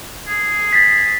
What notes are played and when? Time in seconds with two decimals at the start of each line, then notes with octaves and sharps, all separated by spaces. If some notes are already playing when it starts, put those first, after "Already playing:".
0.27 G#4
0.73 A6 B6